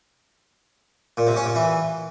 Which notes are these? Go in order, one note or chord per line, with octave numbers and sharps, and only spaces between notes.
A#2
C3
C#4
A#2
E3